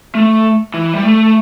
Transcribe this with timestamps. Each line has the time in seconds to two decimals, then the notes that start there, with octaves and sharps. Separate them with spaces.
0.15 A3
0.74 E3
0.94 G3
1.03 A3